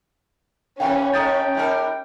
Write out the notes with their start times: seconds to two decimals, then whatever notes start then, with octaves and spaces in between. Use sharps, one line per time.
0.80 C3 D#3 E3 C#4 A#4 F5 G5
1.13 D#2 A3 D#4 G5 A#5 D#6 A6
1.55 G#2 G3 A#4